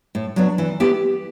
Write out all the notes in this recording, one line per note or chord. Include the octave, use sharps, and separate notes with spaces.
A2
F#3 B3 D4
E3
B3 E4 G4